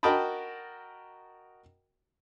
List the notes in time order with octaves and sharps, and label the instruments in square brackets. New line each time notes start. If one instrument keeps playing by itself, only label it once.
[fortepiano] F#4 A#4 D#5 G5 A5 B5